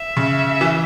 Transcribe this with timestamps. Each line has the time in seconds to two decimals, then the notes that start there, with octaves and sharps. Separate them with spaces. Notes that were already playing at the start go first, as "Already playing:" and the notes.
Already playing: E5
0.17 C#3
0.61 E3